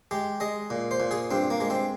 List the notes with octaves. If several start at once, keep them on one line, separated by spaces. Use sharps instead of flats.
G#3 G4
G#3 D#5
A#2
C5
A#2
G#4
G2 C4
A#3
G#3
C4